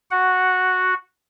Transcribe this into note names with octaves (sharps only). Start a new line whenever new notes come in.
F#4 F#5